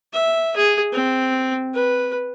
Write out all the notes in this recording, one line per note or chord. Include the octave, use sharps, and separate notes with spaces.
E5
G#4
C4
B4